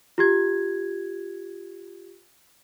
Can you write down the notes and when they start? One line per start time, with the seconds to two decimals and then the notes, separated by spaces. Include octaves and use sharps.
0.18 F4 G4 G#6